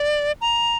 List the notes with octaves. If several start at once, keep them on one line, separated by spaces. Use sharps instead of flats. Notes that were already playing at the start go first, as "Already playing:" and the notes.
Already playing: D5
A#5